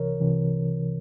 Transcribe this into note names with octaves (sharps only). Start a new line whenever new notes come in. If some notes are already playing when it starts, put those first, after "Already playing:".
Already playing: C2 C3 E3 A#4 C#5
C2 C3 E3